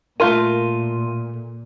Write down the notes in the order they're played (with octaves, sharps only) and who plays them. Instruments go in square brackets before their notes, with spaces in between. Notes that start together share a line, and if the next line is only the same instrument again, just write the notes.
[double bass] A#2 [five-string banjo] A3 F4 A#4 [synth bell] C6 D#7